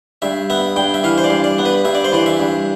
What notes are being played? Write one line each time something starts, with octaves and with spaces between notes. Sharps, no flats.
G2 E5
B3 E5
G2 G5
E5
E3 F5
C5
D5
G2
D5
B3
B4
G2 E5
D5
C5
E3 D5
E5
G2